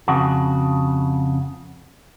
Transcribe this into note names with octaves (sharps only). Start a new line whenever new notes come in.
F2 C#3 F#4